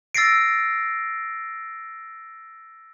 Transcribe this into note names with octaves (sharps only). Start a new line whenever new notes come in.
E6 A6 A#6 C7 D7